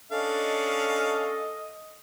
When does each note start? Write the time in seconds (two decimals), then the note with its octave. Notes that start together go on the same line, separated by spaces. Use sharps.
0.12 C#4 D4 A4 D#5 F5